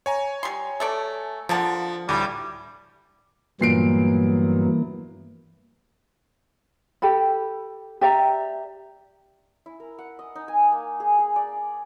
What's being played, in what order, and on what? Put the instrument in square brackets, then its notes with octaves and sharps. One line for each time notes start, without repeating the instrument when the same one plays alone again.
[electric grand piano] C#5 G#5 A#5
[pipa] G3 C6
A3 A4 D5
[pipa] D3 A#3 A5 [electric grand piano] F3 F#5
[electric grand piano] D2 A2 [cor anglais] G3
[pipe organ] G2 F#3 B3 [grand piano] A#2 C7 D7 [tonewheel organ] E3 A#3
[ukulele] G4 A4 B5
G4 D5 E5 A#5
[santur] E4
A#4
F#5
D#5
D#4
G#5
A#3
G#4
G#4
D5